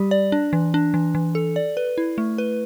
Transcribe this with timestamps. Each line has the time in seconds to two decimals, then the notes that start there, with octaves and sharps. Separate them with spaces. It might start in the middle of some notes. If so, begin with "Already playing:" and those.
Already playing: G3 G4
0.11 D5
0.32 D4
0.53 E3
0.74 D4
0.94 E3
1.15 E3
1.35 A4
1.56 D5
1.77 B4
1.98 E4
2.18 A3
2.38 B4